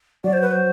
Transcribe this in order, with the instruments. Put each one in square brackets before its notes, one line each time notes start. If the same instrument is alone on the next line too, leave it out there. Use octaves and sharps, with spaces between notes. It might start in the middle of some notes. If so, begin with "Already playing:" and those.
[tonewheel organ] F#3 [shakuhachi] D5
[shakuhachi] C5
B4
C5